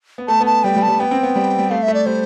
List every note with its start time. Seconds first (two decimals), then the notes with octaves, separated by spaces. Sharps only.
0.18 B3
0.28 A3 A5
0.40 B3
0.46 A5
0.64 G3 G5
0.76 G3
0.82 A5
0.88 G3
0.99 B3 G5
1.11 C4
1.23 B3
1.36 G3
1.59 G3
1.70 A3 F5
1.83 E5
1.88 A3
1.94 D5
2.06 G3 C5